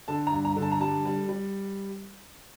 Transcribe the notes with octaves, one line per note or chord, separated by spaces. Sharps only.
D3 A5
A#5
G2
A#5
D3
A5
A#5
G3 A5
G3
G3